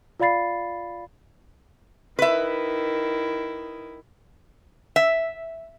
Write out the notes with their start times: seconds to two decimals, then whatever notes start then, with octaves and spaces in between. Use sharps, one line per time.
0.20 F4 D5 F5 B5 A6 C7
2.19 D#3 E4 B4 E5
4.96 E5